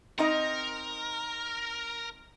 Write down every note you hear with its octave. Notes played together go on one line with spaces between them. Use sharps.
C4 D#4 A#4 D#5